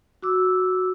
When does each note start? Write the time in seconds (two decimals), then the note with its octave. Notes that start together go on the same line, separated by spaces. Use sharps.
0.22 F#4 D6 E6